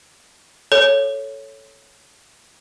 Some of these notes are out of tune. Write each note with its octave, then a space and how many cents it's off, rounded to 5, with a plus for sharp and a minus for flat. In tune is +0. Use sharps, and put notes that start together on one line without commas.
A4 +0 C#5 +0